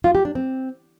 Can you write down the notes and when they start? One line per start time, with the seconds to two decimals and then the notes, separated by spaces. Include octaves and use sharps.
0.04 F4
0.15 G4
0.25 D4
0.35 C4